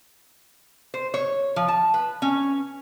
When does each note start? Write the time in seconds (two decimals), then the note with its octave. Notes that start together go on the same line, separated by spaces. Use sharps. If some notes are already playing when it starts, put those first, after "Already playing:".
0.94 C5
1.14 C#5
1.56 F3
1.68 A5
1.94 B4
2.22 C#4